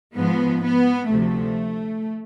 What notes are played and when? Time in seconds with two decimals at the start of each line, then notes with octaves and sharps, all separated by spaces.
0.16 G#2 F3 B3
0.63 B3
1.09 D2 C3 F3 A3